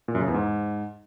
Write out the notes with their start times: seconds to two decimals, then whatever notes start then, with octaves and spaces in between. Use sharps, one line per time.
0.08 A#2
0.15 F#2
0.21 C#3
0.28 E2
0.34 G#2